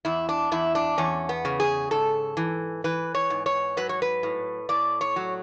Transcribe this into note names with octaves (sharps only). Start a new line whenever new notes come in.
E2 E4
D4
E2 E4
D4
E2 C#4
B3
C#3
G#4
G#2 A4
E3
E3 B4
C#5
G#2
C#5
F#3 B4
C#5
B4
A2
A2 D5
C#5
F#3